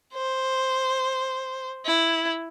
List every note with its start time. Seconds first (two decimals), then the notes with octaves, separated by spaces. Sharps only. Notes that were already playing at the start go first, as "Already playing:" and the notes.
0.14 C5
1.86 E4